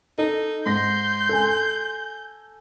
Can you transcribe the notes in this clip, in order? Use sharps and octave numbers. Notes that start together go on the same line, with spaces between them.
D#4 A4
G#2 C6 G6 A#6
A4 G#5